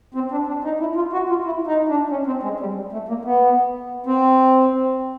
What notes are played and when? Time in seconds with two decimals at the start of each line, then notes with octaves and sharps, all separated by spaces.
0.14 C4
0.31 D4
0.47 D4
0.64 D#4
0.80 E4
0.95 F4
1.13 F#4
1.29 F4
1.44 E4
1.67 D#4
1.89 D4
2.10 C#4
2.26 C4
2.43 G#3
2.60 G3
2.92 A3
3.08 A#3
3.25 B3
4.06 C4